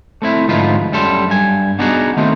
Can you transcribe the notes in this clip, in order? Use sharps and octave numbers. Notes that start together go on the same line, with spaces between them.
A3 C4 E4
D2 G#2 F3 D#4 F4 B4
F#2 G3 A4 C6
G2 G#5
B3 D4 D#4 F#4 G#4
D#3 A3 C4 D#4